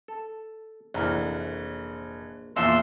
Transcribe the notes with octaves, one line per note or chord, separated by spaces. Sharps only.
A4
F1 A#1 E3 A#4
E2 A#2 F3 E5 C6 E6